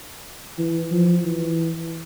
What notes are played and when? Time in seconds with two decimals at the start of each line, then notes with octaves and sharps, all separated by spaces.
0.58 E3
0.91 F3
1.24 E3